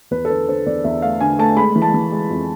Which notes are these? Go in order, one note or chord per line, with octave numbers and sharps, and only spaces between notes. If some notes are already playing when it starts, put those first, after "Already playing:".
E2 B4
A4
D3 B4
D3 C5
E2 D5
E2 E5
A3 F5
D3 G#5
A3 A5
G#3 B5
E3
A5
E3
G#3
F2